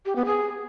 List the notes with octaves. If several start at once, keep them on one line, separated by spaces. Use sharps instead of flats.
G4
B3
G#4